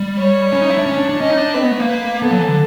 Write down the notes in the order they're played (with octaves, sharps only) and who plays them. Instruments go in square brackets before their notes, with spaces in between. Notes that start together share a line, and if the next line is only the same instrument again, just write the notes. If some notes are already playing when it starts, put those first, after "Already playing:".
Already playing: [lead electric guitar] G3
[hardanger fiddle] C#5
[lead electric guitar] C#4
D#4
E4
D4
C#4
D4
D4
[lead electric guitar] C#4 [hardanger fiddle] D#5
[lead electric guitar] D#4
D4
[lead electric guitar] C4 [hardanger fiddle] B4
[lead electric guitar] B3
A3
A#3
[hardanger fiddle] B4
[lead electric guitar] B3 [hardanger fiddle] A4
[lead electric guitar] F#3
E3
D3